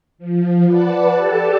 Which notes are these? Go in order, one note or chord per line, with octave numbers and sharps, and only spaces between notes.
F3
B4 D5 F#5 A5
G4 A4 D5 A5